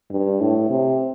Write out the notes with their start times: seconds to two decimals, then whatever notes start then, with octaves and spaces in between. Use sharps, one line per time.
0.11 G2
0.41 A2
0.70 C3